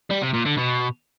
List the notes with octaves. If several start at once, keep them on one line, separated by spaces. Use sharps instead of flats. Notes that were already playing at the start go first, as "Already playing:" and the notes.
G3
C3
A#2
D3
B2